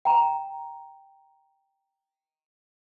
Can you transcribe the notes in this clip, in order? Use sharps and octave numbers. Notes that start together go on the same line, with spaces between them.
G5 A#5